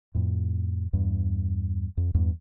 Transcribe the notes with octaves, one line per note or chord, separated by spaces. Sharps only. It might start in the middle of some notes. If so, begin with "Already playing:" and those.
F2 A2
E2 G2
F2
E2 G2